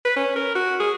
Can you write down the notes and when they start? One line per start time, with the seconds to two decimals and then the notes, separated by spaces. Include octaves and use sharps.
0.05 B4
0.16 C#4
0.36 A#4
0.55 F#4
0.80 G#4